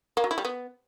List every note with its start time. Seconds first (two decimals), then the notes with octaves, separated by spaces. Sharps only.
0.17 A#3
0.24 F#3
0.31 E4
0.38 G3
0.45 B3